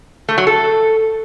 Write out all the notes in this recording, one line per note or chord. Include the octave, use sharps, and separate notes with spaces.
A3
F#3
A4